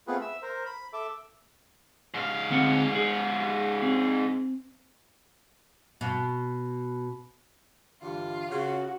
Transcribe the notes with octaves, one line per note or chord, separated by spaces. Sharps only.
A3 B3 C4 F4 G#4 B4
E5 E6
A#4 C5
B5
A4 E5 D6
G#2 F5
D2 C4 F#5
G#4
C4
B2
G2 D3 E3 F4
C#3 F#4